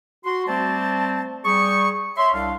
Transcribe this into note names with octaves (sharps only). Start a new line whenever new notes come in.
F#4 C6
G3 A3 C4 C5 D5 A5
G3 G#4 C#6
C#5 E5 C6
C2 D4 F5